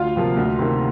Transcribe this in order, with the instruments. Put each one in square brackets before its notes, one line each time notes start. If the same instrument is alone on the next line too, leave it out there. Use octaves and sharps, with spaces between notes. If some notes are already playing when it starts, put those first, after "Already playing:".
Already playing: [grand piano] D2 F4 F5
C3 F3 A#3
D2
C3 D#3 A#3